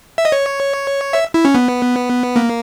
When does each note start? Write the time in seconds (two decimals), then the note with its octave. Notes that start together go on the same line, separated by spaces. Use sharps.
0.18 E5
0.25 D#5
0.32 C#5
1.13 E5
1.34 E4
1.45 C#4
1.55 B3
2.36 A#3